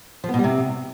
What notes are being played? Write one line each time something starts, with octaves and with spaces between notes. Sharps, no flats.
F3
B3
B2
G3
C3